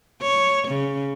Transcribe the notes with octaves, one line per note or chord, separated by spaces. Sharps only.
C#5
C#3